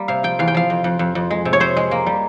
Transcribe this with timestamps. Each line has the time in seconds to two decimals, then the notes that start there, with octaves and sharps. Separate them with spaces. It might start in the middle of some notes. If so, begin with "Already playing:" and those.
Already playing: G3 A#3
0.08 C3 F5
0.23 F3 G5
0.39 E2 F5
0.48 G5
0.54 F3 F5
0.70 F2
0.84 F2
0.99 F2
1.15 F2
1.31 G#3
1.45 C3
1.53 C#5
1.60 C3 C5
1.77 G#3
1.91 A#3
2.06 G3